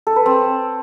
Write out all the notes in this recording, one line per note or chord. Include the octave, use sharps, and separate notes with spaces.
A4
B4
C4